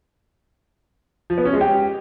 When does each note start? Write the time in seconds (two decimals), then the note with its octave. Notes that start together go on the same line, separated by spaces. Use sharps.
1.30 F3
1.38 B3
1.45 C#4
1.53 G#3
1.61 G4